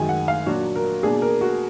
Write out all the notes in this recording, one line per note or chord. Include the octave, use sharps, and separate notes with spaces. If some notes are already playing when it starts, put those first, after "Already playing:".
Already playing: F#2 D#3 G#3 G#5
F#5
F5
A#2 F#3 A#3 D4 F#4
A#4
B2 A#3 D4 G#4
A#4
F#4